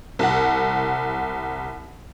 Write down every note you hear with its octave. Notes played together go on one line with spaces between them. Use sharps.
C2 F#5